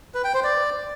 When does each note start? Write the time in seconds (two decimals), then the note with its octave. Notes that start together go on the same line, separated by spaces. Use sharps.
0.15 B4
0.24 G5
0.34 C5
0.44 D5